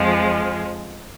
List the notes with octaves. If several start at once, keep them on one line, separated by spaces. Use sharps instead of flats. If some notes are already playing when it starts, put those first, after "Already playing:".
Already playing: F2 F3 G#3